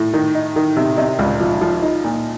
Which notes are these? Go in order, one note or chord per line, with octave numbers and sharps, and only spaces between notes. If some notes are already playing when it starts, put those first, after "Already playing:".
Already playing: A2
D#3
D#4
D#3
C3
C3 D#5
C#2
F3
F3
D#4
A#2